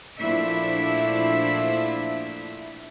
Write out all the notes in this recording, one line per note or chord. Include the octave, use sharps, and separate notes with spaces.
A#2 F3 A3 D4 E4 E5